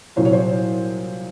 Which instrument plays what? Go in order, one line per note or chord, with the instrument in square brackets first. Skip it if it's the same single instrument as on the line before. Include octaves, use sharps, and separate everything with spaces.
[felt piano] C2 A#2 F#3 C5
C#5
C5